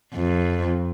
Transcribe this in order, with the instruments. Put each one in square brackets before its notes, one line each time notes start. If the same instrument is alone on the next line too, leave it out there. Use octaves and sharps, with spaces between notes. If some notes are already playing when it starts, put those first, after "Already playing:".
[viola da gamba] F2